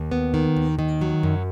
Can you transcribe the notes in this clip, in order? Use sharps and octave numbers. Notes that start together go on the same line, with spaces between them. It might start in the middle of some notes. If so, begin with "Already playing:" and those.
Already playing: D#2
B3
D#3
D#2
D#3
F#3
F#2